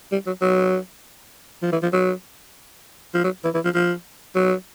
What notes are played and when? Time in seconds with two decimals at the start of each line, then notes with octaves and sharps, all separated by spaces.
0.12 G3
0.27 F#3
0.42 F#3
1.63 F3
1.72 E3
1.83 F3
1.93 F#3
3.14 F3
3.24 F#3
3.44 E3
3.54 E3
3.64 F3
3.75 F3
4.35 F#3